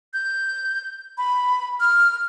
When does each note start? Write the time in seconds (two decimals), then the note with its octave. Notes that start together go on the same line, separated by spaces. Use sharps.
0.14 G6
1.18 B5
1.80 F6